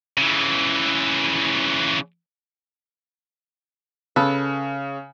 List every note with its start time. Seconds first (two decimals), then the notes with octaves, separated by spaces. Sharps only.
0.17 C#3 E3
4.16 C#3 A4 B4